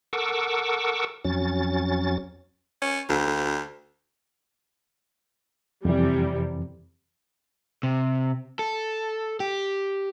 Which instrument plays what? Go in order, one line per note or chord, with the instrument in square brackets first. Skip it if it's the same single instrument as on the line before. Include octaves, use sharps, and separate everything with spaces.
[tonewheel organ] A4 A#4 F#5 C#6 D6 E6
F2 F#3 C#4 A6
[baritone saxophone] C#4
D2
[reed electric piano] F2 E3 [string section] C3 G3
[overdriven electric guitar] C3
A4
G4